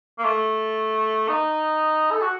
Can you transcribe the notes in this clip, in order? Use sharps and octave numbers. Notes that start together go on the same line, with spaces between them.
A#3
A3
D#4
A4
F#4